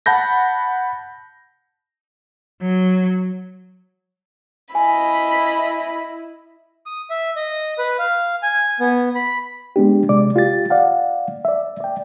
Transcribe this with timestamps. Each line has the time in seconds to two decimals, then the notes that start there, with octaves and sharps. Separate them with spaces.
0.06 F#5 A5 B5 G6 A#6
2.61 F#3
4.75 E4 D#5 G#5 B5
6.86 D#6
7.10 E5
7.36 D#5
7.78 B4
7.99 F5
8.43 G#5
8.80 B3
9.15 B5
9.76 G#3 B3 D4 G4
10.09 C3 G#3 D5 D6
10.36 F4 G4 A6
10.70 D5 F5 F#5
11.45 D5 E5
11.80 D5 G5